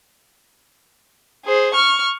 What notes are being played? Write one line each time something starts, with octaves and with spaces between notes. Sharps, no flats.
G#4 C5
C#6 F6